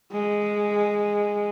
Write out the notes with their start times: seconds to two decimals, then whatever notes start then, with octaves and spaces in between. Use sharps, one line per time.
0.12 G#3